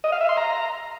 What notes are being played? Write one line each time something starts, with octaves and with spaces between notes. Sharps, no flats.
D#5
F5
E5
C6
A#5